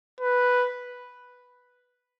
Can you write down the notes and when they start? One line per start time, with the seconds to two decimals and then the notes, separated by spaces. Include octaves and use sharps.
0.21 B4